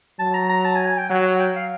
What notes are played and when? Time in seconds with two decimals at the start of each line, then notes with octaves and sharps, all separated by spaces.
0.19 F#3 A5
0.34 A#5
0.49 A#5
0.65 A5
0.76 G#5
0.86 G#5
0.98 G5
1.09 F#3 F#5
1.25 F#5
1.40 G5
1.56 F5